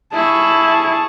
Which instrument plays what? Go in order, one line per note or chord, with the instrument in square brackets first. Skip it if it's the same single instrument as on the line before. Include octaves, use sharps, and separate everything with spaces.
[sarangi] E4 [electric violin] G#4 C#6 [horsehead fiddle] A5